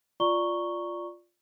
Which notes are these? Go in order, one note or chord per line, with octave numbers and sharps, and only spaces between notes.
F4 D5 A#5 C#6 G7